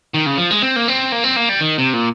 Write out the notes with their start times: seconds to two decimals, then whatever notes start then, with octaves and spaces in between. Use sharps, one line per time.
0.14 D#3
0.26 C#3
0.38 F3
0.51 G#3
0.62 C4
0.76 A#3
0.88 C4
1.12 A#3
1.24 C4
1.36 A#3
1.49 G3
1.61 D#3
1.78 C3
1.93 A#2